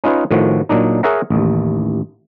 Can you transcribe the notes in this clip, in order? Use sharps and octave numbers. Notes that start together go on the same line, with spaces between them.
C#4 D#4 F4 B4 C#5
A2 D#3 F3 F#4
A#2 F#3 D4 D#4
G#4 A#4 C#5 E5 F#5 A#5
A1 D#2